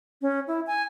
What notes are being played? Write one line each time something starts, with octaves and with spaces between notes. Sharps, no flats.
C#4
E4
G#5